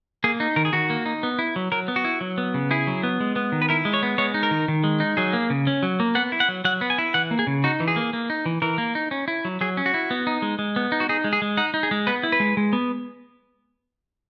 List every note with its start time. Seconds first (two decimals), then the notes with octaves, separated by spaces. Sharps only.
0.24 A#3 G#4
0.40 D#4
0.56 D#3 A#4
0.65 G#4
0.73 D#3 F#4
0.90 A#3
1.06 D#4
1.23 B3
1.39 E4
1.56 F#3
1.72 F#3 A#4
1.88 B3
1.96 F#4
2.04 E4
2.21 F#3
2.38 B3
2.54 C#3
2.71 E4 G#4
2.87 F#3
3.03 B3
3.20 G#3
3.36 B3
3.52 D#3
3.62 B4
3.69 E4 A#4
3.85 G#3
3.94 C#5
4.03 B3
4.18 G#3 C#5
4.34 D#4
4.43 A#4
4.51 D#3
4.68 D#3
4.84 G#3
5.00 D#4
5.17 F#3 G#4
5.33 A#3
5.50 C#3
5.67 C#4
5.83 F#3
6.00 A#3
6.15 B3 F#5
6.32 E4
6.40 F#5
6.48 F#3
6.65 F#3 F#5
6.81 B3
6.90 G#5
6.98 E4
7.14 E3 F#5
7.31 A#3
7.39 G#4
7.47 C#3
7.64 D#4 F#4
7.80 E3
7.88 G#4
7.96 A#3
8.13 A#3
8.30 D#4
8.46 E3
8.62 E3 A#4
8.78 A#3
8.95 D#4
9.11 C#4
9.28 E4
9.45 F#3
9.61 F#3 G#4
9.77 C#4
9.86 F#4
9.94 E4
10.11 B3
10.27 D#4
10.42 G#3
10.59 G#3
10.76 B3
10.92 D#4
11.00 F#4
11.09 D#4 G#4
11.24 G#3
11.33 G#4
11.42 G#3
11.57 D#4 F#5
11.74 D#4
11.83 G#4
11.91 G#3
12.07 B3 B4
12.23 E4
12.32 B4
12.40 G#3
12.57 G#3
12.73 B3